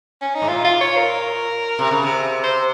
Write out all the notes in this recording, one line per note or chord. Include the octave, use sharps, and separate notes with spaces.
C#4
D#4
G#2
A#2 F4
F4
C#5
A#4
C3
C#3
C3
C5